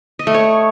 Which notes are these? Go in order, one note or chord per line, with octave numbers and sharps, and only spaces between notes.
D#5
A3
C#5